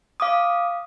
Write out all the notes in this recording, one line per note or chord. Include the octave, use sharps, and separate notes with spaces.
F5 D6 D#6